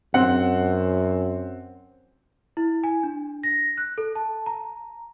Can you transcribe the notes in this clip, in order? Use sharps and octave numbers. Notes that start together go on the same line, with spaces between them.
F#2 C4 F#5
E4
G#5
D4
A#6
F#6
A4
A5
A#5